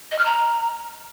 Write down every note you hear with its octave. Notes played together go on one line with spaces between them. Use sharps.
D#5
F6
A#5